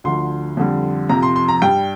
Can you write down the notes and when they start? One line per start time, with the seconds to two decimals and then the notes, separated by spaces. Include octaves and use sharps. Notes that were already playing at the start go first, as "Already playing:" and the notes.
0.04 D2 D3 F3 C6
0.57 F2 D3 G3
1.09 F2 C3 F3 A#5
1.23 C6
1.36 C6
1.48 A#5
1.62 G2 G3 G5